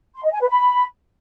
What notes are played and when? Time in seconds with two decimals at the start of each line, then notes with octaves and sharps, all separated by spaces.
0.15 C6
0.24 D#5
0.32 G#5
0.41 B4
0.49 B5